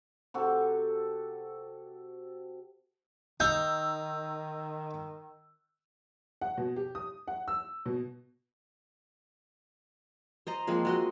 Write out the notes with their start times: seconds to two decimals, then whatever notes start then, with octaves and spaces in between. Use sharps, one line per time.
0.34 C3 F#4 A4
3.40 D#3 D#4 E6 G6
6.41 F#5
6.57 B2
6.76 G4
6.95 D#6
7.28 F#5
7.48 E6
7.86 B2
10.47 C5 D#5 A#5
10.67 F3 G#3 A#3 C4
10.85 G#3 F#4 D#5